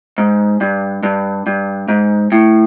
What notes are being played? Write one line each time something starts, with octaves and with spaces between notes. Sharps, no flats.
G#2
G2
G2
G2
G#2
A2